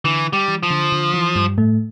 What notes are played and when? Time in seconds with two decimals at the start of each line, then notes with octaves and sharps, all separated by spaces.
0.04 D3 E3
0.33 G3
0.48 E3
0.63 F3
0.70 D3
0.92 D3
1.14 E3
1.35 G2 G3
1.58 A2 A3